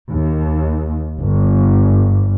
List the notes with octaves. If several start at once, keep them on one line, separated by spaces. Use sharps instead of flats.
D#2
G1